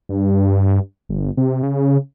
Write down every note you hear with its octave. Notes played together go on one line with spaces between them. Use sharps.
G2
G1
C3
C#3